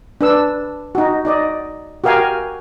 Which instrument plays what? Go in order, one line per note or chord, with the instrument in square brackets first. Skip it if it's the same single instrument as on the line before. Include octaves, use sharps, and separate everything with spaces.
[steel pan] D4 B4 E6
D#4 F#4
D#4 D5 D#5
F#4 G4 A#4 F5 G5 G#5